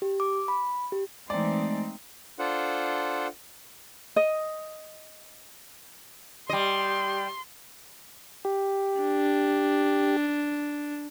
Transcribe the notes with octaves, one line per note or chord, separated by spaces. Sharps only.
G4
D6
B5
G4
E3 G#3 A3 C4 D#4 D5
D4 F4 A4 C5 F#5
D#5
G3 D#5 C6
G4
D4